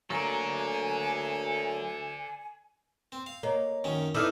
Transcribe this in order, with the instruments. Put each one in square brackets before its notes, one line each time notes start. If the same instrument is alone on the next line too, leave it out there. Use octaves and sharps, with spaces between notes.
[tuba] D2 [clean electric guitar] F#3 A#3 [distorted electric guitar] A4 D5 [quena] G#5
[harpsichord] C4
F5
[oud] A#3 [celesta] C#5 D#5
[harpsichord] F#2 D#3 C#4
[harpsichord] B3 G#4 A4 [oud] D#4 E4 D5 [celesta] E6 F6